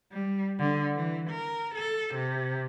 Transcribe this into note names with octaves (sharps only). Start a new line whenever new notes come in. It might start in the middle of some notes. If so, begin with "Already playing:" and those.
G3
D3
E3
A#4
A4
C3